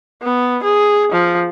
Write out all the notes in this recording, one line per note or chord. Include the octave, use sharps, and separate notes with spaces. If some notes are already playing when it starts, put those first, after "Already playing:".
B3
G#4
F3